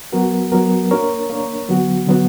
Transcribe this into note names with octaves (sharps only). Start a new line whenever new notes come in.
F#3 B3 F#4 A#4
F#3 B3 F#4 A#4
A#3 D4 A#4 C#5
A#3 D4 A#4 C#5
D3 F#3 B3 F#4
D3 F#3 B3 F#4